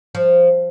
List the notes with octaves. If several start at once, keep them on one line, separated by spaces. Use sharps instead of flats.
F3